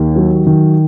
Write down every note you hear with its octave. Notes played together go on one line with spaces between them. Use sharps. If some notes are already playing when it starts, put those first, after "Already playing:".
Already playing: D#2 D#3
F#3
D#3